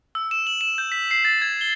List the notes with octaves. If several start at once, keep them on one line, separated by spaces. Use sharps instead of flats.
E6
E7
F#7
E7
G6
B6
C7
A6
G#6
G7